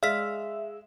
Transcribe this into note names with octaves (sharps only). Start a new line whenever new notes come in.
G#3 D5 E5 F5 B6